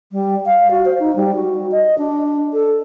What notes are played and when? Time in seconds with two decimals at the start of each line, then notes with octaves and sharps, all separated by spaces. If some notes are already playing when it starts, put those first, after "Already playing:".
0.12 G3
0.46 F5
0.71 F#4
0.85 C5
1.00 D#4
1.16 G3
1.35 F#4
1.72 D#5
1.98 D4
2.53 A4